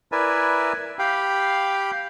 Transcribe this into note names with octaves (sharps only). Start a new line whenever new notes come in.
E4 A#4 B4 D5 E5 G#5
G4 F5 G5 B5